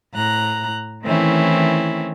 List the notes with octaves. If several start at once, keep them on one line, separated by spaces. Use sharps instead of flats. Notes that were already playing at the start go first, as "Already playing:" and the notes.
A2 A#5 F#6
D#3 E3 A3 C4 C#4 E4